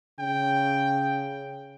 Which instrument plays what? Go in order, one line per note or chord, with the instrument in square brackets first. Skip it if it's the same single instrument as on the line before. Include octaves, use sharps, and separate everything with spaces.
[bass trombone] C#3 [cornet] G5